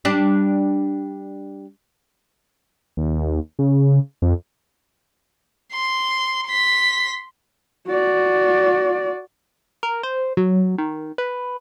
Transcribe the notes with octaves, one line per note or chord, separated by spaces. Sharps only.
G3 D4
D#2
C#3
F2
C6
C6 B6
F#4 D5
A#4
C5
F#3
D#3
B4